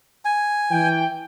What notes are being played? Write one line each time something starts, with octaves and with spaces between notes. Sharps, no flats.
G#5
E3 G5